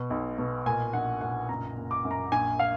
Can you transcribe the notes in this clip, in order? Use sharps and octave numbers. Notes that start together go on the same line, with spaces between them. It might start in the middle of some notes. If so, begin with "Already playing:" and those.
Already playing: B2
B1
B2
A#2 G#5
A#1 F#5
A#2 F#5
F#1 A#5
F#1
D6
F#2
A#5
A#1 G#5
F5